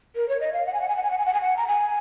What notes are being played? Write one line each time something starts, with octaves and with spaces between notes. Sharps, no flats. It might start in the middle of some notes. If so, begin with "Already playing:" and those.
A#4
C#5
D#5
F5
F#5
G#5
F#5
G#5
F#5
G#5
F#5
G#5
F#5
G#5
F#5
A#5
G#5